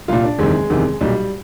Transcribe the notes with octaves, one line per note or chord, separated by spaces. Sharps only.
C2 A#2 F4
D4
F#1 E2 C3 D#3 G#3
F#1 E2 C3 D#3
B1 A#2 G3